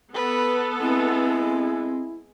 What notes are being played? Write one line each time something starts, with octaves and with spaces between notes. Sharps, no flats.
B3 A4 B4
G#3 C4 E4